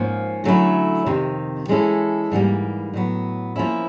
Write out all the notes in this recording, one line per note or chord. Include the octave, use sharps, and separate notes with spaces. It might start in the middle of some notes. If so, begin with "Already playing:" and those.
Already playing: G#2 F3 A#3 C#4
D3 F#3 A3 C#4 E4
F2 C3 D#3
E3 G#3 C#4 E4 A4
G#2 E3 G3 A#3
A2 F#3 B3
F3 A#3 C#4 E4